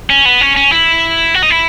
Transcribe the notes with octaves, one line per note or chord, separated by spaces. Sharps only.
C#4
B3
C#4
C#4
E4
F#4
D#4
E4